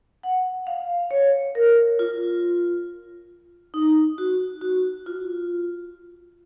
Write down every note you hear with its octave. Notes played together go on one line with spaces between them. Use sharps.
F#5
F5
C#5
A#4
F4
D#4
F#4
F#4
F4